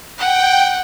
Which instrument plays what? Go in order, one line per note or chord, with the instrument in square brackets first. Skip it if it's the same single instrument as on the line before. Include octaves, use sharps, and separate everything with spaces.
[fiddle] F#5 [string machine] G5